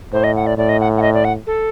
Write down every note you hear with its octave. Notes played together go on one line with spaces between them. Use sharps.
A2 C5
D#5
F#5
D5
A2 D5
D#5
F#5
F#5
D#5
D5
F#5
A4